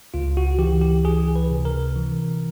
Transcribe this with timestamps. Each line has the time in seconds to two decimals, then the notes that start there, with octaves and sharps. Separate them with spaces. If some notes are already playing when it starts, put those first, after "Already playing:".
0.14 C#2 F4
0.37 F#4
0.59 E3 G4
0.81 G4
1.05 C#2 G#4
1.36 B4
1.51 C3
1.65 A#4
1.96 E3